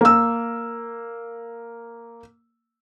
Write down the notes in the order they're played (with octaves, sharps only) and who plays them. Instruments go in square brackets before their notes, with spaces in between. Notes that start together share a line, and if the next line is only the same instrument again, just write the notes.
[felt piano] A#3 E6